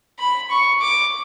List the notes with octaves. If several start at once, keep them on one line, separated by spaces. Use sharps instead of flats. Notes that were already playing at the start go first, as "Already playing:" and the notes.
B5
C#6
D6